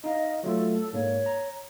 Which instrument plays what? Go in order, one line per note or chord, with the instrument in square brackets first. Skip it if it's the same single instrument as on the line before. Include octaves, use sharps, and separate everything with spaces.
[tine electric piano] D#4 F5 [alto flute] D#5
[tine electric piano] F#3 A3 F4 [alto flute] A4
[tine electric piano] G#2 A#3 [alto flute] C#5
[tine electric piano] A#5